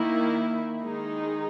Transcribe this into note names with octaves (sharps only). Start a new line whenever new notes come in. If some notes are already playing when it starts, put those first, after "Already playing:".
Already playing: D#3 A#3 E4
D#3 G#3 D#4 G#4